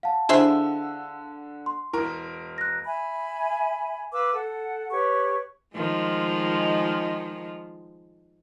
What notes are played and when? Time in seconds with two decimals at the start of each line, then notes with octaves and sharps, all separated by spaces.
0.03 F5 F#5 A5
0.29 D3 D4 E4 G#4 C5 E5 E6 G7
1.66 C6
1.93 E1 E4 A#4
2.58 F#6 A#6
2.85 E5 G#5 B5
4.12 B4 F5 D6 E6
4.34 A4 F#5
4.92 G4 B4 C#5 C#6
5.76 D#3 F3 G#3